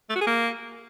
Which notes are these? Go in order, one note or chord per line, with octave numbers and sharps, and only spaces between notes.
A3
F#4
G#4
A#3